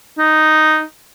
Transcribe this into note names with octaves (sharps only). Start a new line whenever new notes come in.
D#4